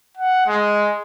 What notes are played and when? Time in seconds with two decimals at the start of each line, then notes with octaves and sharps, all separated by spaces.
0.17 F#5
0.47 G#3